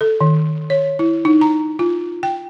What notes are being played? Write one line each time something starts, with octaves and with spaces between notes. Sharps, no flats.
A4
D#3
C#5
E4
D#4
A#5
F4
G5